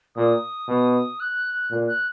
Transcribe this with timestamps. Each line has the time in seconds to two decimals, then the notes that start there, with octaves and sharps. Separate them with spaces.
0.16 A#2 D#6
0.68 B2
1.20 F#6
1.71 A#2
1.88 F#6